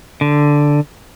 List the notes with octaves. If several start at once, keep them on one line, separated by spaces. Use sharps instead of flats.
D3